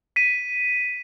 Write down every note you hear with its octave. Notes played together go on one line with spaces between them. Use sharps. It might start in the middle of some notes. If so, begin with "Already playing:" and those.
B6 D#7